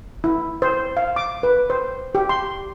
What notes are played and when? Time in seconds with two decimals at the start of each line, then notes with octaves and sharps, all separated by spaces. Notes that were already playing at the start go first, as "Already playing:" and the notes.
0.24 E4
0.62 C5
0.97 F5
1.16 D6
1.43 B4
1.70 C5
2.15 G4
2.29 C6